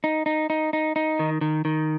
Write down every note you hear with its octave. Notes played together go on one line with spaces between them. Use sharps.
D#4
D#4
D#4
D#4
D#4
D#3
D#3
D#3